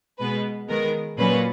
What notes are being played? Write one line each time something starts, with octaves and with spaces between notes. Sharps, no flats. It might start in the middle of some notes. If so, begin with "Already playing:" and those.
B2 G#3 B3 B4
D#3 G#3 B3 A#4
A#2 F#3 C#4 B4